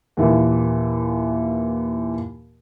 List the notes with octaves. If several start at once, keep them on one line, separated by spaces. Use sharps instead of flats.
D#2 A#2 E3